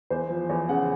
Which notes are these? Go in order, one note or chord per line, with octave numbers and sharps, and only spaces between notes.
E2 C5
F3
E2 C#5
C#3 F#5